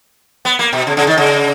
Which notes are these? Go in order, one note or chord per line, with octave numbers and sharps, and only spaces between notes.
B3
A#3
B2
C#3
C#3
D#3
C#3